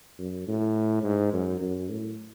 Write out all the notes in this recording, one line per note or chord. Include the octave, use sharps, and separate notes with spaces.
F#2
A2
G#2
F#2
F#2
A2